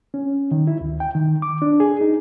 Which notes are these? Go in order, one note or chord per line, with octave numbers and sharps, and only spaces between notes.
C#4
D#3
E4
D2
G5
D#3
D6
D4
G#4
D#4